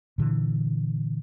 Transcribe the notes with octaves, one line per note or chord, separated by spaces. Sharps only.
A#2 D3 E3